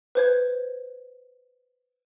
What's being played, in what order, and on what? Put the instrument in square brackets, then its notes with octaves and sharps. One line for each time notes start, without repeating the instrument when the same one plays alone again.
[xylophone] B4 C5 G#6